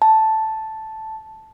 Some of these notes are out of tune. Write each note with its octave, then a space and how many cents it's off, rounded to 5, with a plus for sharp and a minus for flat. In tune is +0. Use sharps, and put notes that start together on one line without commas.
A5 -5